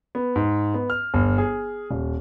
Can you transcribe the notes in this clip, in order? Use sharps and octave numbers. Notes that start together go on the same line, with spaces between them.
B3
G#2
B3
F6
G1
G#4
D#1